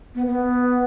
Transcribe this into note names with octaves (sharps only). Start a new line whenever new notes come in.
B3
B3